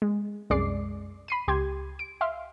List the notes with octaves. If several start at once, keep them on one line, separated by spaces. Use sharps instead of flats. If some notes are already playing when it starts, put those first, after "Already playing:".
G#3
C2 F#2 G#3 D5 D6 C7
B5 C7 D#7
C#2 G4 C6 G#6
D7
E5 F5 C6